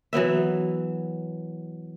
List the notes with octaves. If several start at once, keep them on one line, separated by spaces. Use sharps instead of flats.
E3 F#3 B3 E5